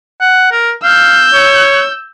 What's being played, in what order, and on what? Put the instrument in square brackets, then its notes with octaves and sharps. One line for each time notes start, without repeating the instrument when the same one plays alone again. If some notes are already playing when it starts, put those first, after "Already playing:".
[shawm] F#5
A#4
[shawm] F5 [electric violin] E6 G6
[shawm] C#5